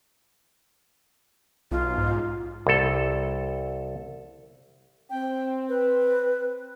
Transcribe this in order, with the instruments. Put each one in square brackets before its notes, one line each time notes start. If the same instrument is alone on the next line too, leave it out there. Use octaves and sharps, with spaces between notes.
[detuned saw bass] B1 [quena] F4
[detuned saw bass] G#2
[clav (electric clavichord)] C2 A4
[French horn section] C4 [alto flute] G5
[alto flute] B4